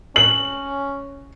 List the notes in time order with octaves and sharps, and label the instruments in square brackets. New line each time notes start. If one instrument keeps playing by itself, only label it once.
[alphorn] C#4 [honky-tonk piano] F#7